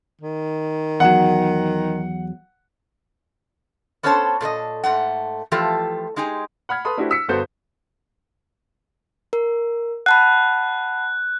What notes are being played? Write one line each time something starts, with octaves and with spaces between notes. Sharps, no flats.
D#3
E2 F#3 F#5
B3 C#4 A4 C5 C#5 A5
A#2 A4 A#4 D#5
G#2 A3 F#5
E3 F3 A3 F4 G4 A4
G#3 D#4 G4 G#4 G#5
F#5 B5 F6 G#6
A4 B4 A5 B5 C6 D#6
A3 D4 E4 F#4 G4 C5
E6 B6 C#7
G1 B3 F#4 A4 C5 G6
A#4
F#5 A5 B5 F#6